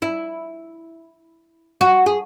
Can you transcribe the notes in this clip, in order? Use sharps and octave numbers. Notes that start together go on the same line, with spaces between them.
E4
F#4
G#4